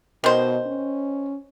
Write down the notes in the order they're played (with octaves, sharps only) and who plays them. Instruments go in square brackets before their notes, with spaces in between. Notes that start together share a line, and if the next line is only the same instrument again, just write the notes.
[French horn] B2 [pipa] D#3 C5
[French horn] C#4